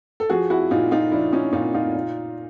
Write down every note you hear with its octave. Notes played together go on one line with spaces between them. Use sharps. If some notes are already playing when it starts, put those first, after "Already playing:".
A4
F3 F#4 G#4
E4 F#4
A#2 D#4 F4
D#4 F4
F3 D4 E4
C#4 D#4
A#2 D#4 F4
D#4 F4
A#2